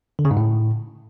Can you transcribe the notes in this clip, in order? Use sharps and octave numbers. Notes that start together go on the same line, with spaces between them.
D3
C#3
G#2
A2